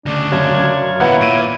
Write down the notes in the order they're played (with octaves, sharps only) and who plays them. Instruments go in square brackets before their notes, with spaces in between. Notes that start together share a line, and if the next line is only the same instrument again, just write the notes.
[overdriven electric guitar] D2 C#3 [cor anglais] D4
[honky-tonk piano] F#2 [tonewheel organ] C#5 F5 G#6
[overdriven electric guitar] D#2 B2 [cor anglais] E4 [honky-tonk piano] B4 F#5 A#5
[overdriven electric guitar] A#2 [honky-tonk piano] D7 D#7